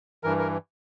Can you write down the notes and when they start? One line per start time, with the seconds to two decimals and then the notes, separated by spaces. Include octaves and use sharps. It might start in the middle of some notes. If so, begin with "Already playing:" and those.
0.24 G2 E3 A#4
0.38 A#4